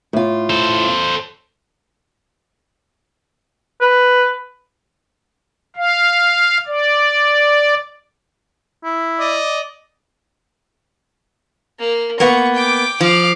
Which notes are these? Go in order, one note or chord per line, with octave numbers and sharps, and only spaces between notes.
A2 F4
A4 C5
B4
F5
D5
E4
D5 D#5
A#3
A#3 B3 C#6
G5 D6
F3 F5 D6